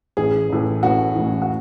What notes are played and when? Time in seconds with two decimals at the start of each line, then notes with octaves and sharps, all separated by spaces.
0.17 A1 A2 E3 G#4
0.49 A1 A2 E3
0.83 A1 A2 E3 F#4
1.16 A1 A2 E3
1.42 F#4